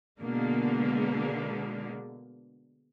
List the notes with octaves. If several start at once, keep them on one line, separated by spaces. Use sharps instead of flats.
B2 D3 G#3 A#3